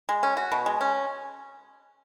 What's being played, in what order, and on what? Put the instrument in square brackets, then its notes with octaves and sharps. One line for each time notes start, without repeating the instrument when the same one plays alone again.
[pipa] G#3
C#4
F#4
B2
G#3
C#4